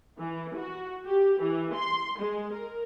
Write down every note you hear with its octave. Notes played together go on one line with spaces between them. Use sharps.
E3
F#4
G4
E3
C6
G#3
A#4